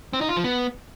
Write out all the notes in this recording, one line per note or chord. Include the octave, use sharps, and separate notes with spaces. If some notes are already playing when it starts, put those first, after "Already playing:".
C4
D#4
F4
F3
B3